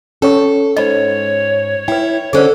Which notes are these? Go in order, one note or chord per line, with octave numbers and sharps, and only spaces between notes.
C#4 A4 C#5 C#6
G#2 C#5 D#5 B5
E4 B4 G5
D3 C#4 G#4 A4 C5 D5